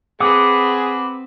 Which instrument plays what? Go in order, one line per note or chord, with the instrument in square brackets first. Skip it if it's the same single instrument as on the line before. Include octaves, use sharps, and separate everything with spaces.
[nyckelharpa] C4 B4 [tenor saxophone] G#4 [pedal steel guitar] F#5 D6 D#6